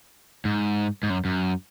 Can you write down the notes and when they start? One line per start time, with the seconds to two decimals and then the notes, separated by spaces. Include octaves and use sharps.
0.45 G#2
1.03 G#2
1.10 F#2
1.25 F#2